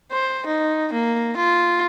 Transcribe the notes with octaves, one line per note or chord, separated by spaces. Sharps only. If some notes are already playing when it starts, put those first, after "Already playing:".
C5
D#4
A#3
F4